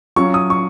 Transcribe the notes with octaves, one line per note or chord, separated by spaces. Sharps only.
F#3 C#4 F4 C#6
D#6
C#6